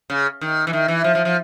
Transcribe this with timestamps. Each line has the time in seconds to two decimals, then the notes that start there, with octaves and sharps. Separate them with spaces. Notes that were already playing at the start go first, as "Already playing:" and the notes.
0.10 C#3
0.41 D#3
0.67 E3
0.73 D#3
0.88 E3
1.04 F3
1.15 F3
1.25 F3